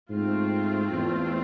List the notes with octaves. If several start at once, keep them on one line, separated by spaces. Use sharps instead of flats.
G#2 A3 C4 F4
E2